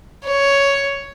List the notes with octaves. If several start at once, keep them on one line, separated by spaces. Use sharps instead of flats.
C#5